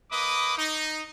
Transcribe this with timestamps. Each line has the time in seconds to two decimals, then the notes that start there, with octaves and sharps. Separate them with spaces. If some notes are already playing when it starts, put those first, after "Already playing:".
0.11 A#3 B4 D#5 B5 D6 D#6
0.57 D#4